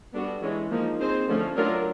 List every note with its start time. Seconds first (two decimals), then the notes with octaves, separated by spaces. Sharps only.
0.14 G3 B3 D4 F#4 A4
0.42 E3 G#3 C#4
0.70 F3 A#3 D#4
1.00 C4 D#4 G#4 C5
1.28 D3 F3 A3 C#4
1.56 F#3 A3 D4 F4 A#4